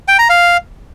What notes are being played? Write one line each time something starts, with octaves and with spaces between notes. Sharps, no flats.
G5
A#5
F5